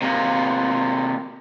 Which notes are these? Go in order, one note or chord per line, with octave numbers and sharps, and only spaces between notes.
C3 A#3